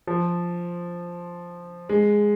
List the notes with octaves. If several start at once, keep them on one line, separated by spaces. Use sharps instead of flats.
F3
G#3